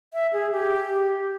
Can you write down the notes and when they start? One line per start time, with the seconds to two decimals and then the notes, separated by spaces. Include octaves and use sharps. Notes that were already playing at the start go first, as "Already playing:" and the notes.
0.13 E5
0.33 G#4
0.52 G4